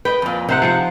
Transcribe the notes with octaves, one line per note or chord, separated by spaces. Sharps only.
B4 D#5 G5
F2 A#2
C3 D#4 C5 F#5
F3 C4 F#5